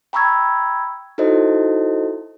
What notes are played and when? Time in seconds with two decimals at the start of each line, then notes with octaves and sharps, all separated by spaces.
0.13 G5 A#5 B5 C#6 E6 G#6
1.18 D#4 E4 F#4 A4 C5 D#5